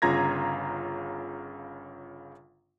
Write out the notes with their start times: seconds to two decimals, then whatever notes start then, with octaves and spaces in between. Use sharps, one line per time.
0.02 G1 C#3 F4 A#5 G#6 A#6